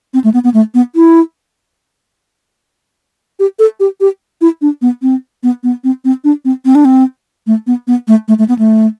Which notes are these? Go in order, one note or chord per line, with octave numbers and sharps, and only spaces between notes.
C4
A3
B3
B3
A3
B3
E4
G4
A4
G4
G4
E4
D4
B3
C4
B3
B3
C4
C4
D4
C4
C4
D4
C4
A3
B3
B3
A3
A3
A3
B3
A3